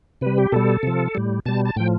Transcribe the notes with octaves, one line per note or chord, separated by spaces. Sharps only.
C3 G3 B4
G4
B2 G3 A4
C3 F3
A2 G3
B2 G3 A5
A5
A2 F3 G5